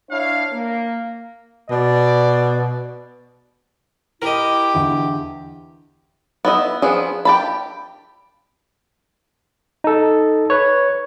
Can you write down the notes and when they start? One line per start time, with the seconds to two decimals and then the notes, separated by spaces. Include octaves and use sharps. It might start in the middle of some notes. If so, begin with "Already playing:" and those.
0.11 D4 E4 C#5 F5
0.53 A#3
1.70 B2 D5
4.22 E4 G4 A#4 D#5
4.74 E2 D3
6.45 B3 E4 D#5
6.82 F3 B3 D4 G#4
7.25 G4 A5 B5
9.84 D#4 A4
10.50 B4 C#5